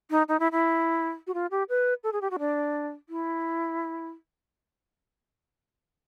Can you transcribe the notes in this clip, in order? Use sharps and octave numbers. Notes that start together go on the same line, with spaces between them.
D#4
D#4
E4
E4
F#4
F4
G4
B4
A4
G#4
G4
F#4
D4
E4